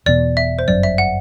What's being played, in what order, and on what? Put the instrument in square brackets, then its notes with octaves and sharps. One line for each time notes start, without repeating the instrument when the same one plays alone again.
[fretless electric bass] E1 E2 B2 [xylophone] D5
[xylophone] E5
C5
[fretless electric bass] G1 F#2 F#3 [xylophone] D5
[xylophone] E5
F#5